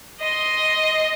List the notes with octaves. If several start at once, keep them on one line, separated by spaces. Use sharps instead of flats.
D#5 C6